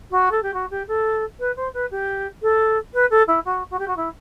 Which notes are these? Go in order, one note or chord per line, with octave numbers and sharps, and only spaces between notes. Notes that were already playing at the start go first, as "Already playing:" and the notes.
F#4
A4
G4
F#4
G4
A4
B4
C5
B4
G4
A4
B4
A4
E4
F#4
F#4
G4
F#4
E4